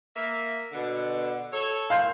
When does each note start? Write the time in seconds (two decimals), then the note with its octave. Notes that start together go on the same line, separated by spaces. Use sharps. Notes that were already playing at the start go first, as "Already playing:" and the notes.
0.16 A#3 E5
0.73 B2 D3
1.53 A4 C#5
1.90 F5 C6 G6